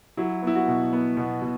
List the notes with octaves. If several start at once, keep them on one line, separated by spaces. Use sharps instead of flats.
F#3 E4
B3 E4
F#4
B2
B3
B2
B2